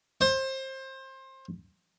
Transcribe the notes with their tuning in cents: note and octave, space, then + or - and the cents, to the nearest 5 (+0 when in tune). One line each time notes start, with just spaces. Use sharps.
C5 +25